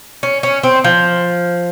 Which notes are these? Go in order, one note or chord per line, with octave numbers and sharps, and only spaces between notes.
C#4
C#4
C4
F3